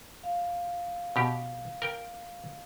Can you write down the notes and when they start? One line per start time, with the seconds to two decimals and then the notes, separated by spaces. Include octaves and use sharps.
0.23 F5
1.16 B2 G4
1.82 A#4 G5